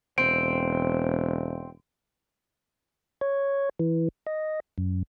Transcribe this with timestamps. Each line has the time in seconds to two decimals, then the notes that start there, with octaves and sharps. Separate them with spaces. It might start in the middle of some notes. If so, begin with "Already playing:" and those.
0.18 E1 C4 D7
3.21 C#5
3.80 E3
4.27 D#5
4.78 F#2